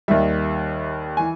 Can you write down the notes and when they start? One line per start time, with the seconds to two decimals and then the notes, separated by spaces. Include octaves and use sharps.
0.08 D#2 D#3 G3 E5
1.17 E3 G#5